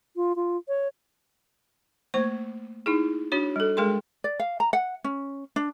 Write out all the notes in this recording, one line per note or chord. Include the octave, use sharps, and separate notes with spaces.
F4
F4
C#5
A3 A#3 C5 C#6
D#4 E4 G#4
D4 F#4 C#5
G3 A4
G#3 G#4 A#4 G5 C6
D5
F5
A#5
F#5
C#4
D4